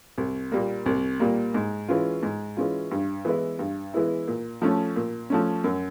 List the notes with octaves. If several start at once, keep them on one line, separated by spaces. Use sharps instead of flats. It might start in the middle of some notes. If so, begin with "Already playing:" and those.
C2
A#2 G3 A#3
C2
A#2 G3 A#3
G#2
E3 G#3 C#4 F4
G#2
E3 G#3 C#4 F4
G2
E3 G#3 B3 E4
G2
E3 G#3 B3 E4
A#2
F3 A3 C#4
A#2
F3 A3 C#4
F#2